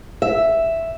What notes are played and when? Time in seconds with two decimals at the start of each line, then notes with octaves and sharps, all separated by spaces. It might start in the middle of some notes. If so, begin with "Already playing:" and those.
0.22 E5